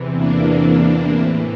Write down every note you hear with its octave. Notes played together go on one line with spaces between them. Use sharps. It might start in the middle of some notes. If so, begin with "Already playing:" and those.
Already playing: E2 C3 E3
A#3 D4
A2 E3 C4 E4